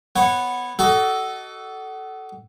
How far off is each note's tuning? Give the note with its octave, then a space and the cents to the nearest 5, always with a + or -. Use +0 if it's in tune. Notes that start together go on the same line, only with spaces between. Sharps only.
B3 +0 C#5 -20 F#5 +0
F#4 +30 A4 -5 D#5 +0